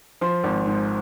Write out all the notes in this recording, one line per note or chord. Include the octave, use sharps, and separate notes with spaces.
F3 C6
G#1
G#2